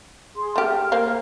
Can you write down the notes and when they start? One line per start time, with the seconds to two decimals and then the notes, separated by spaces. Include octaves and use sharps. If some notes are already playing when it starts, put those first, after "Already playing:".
0.35 G#4 C6
0.56 A3 G4 F6
0.92 A#3 C5 F5